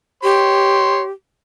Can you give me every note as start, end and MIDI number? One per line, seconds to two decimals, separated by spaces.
0.23 1.10 67
0.23 1.01 73
0.23 1.01 84